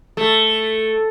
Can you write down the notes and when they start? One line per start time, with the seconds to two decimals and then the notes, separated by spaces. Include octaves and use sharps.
0.17 A3